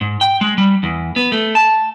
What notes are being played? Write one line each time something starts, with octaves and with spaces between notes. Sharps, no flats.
G#2
G5
G#3
G3
E2
B3
A3
A5